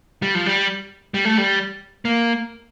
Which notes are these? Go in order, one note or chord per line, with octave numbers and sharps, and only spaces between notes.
G3
F3
G3
G3
A3
G3
A#3